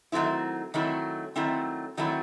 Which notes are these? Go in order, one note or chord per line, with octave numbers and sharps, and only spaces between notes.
D#3 F#3 A3 C4 E4
D#3 F#3 A3 C4 E4
D#3 F#3 A3 C4 E4
D#3 F#3 A3 C4 E4